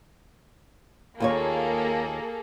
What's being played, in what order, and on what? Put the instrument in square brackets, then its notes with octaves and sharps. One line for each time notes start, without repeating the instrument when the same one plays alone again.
[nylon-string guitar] D#2 F4 C#5 [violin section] A#3 G#4 A4